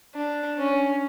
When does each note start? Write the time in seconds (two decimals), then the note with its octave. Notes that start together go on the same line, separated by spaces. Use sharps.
0.15 D4
0.58 C#4